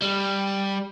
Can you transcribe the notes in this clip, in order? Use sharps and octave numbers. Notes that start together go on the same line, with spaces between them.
G3